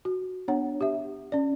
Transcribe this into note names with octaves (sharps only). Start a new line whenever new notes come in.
F#4
B3 D4 C#5 F#5
G4 E5
C#4 D5